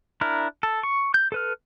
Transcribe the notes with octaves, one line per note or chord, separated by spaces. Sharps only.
D4 E4 A#4
A4
C#6
G6
A4 B4 F6